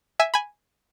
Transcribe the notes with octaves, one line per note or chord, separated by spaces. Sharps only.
E5 G#5
G#5 B5